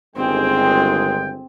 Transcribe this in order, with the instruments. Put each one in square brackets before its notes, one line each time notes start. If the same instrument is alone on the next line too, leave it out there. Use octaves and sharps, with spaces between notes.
[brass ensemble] G1 D#3 G#3 [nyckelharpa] C4 G#4 [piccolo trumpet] G5